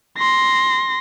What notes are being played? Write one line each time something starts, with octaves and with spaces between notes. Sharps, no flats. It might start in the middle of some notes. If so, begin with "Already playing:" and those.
C6 A#6